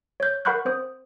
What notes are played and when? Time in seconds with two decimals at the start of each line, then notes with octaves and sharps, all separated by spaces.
0.20 C#5 G6
0.45 A#4 F#5 B5 C#6 F#6 G6
0.65 C4 C5 D#6